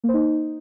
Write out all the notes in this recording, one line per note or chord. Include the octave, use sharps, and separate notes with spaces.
A#3
C5
D#4